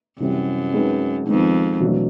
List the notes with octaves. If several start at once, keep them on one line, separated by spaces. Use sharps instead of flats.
F#2 C3 E3 G3 C4
G#3 C4 D#4 G#4 B4
F2 D#3 G#3 B3 D#4
E2 B2 F#3 A3 D4